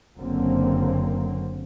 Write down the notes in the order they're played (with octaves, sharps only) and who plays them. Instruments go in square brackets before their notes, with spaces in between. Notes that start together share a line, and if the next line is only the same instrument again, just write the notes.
[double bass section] F#1 F#2 D3 F#3 A#3 C4